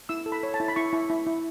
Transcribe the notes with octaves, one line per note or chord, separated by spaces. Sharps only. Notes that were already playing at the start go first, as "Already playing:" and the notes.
E4 E6
A4
B5
C#5
A5
E4
B5
E4 C#6
E4
E4
E4